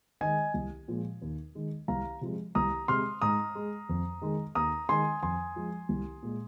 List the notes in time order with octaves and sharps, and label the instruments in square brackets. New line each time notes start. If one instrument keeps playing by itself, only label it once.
[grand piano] D#3 G#3 D#5 G#5
C2
A#2 F3 G#3
D#2
D#3 G#3
C2 F5 A#5
C3 F3 G#3
C2 A#5 D#6
C3 G#3 C6 F6
G#2 A#5 D#6
G#3
F2
D#3 G#3
D#2 A#5 D#6
D#3 G#3 G#5 C6
F2 G#5 C6
F3 G#3
C2
A#2 G#3